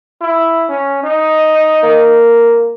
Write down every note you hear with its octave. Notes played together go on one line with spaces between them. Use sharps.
E4
C#4
D#4
A#3